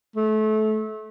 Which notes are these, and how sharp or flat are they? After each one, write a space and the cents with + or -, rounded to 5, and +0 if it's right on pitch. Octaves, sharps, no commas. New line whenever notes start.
A3 -25